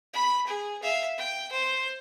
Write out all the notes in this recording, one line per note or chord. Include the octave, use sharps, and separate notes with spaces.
B5
G#4
E5 F5
G5
C5